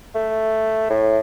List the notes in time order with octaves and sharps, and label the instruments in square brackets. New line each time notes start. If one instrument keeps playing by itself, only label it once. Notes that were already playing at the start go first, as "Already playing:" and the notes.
[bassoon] A3
A2